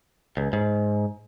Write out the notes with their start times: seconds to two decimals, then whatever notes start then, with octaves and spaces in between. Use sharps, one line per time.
0.37 C#2
0.53 G#2